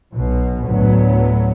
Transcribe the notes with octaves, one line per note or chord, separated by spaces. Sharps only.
B1 B2
D2 A2 F#3 B3